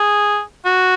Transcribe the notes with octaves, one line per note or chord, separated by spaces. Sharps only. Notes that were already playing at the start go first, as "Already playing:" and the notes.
Already playing: G#4
F#4